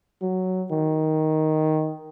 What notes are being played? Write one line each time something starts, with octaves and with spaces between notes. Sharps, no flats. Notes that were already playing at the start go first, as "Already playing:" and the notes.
F#3
D#3